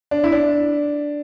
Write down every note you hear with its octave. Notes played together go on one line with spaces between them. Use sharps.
D4
E4
D4